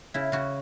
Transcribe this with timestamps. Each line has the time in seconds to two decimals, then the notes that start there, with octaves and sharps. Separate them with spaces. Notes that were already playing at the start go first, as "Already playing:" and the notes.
0.14 C#3 E4
0.32 C#3 F#4